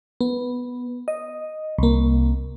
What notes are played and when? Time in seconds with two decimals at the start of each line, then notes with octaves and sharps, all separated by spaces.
0.21 B3
1.08 D#5
1.79 C2 A#3